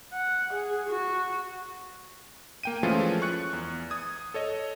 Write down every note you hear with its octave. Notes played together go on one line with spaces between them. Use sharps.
F#5
G#4
F#4
A#3 G5 D#7
E3 F3 G#3 A3 C#4 F4
C#6 F#6 C#7
E2
D#6 G#6
A4 C#5 D#5